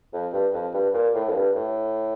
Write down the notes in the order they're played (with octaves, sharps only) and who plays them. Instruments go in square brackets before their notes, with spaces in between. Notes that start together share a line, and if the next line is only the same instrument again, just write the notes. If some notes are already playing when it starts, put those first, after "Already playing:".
[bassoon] F2
G2
F2
G2
A#2
A2
F2
G2
A2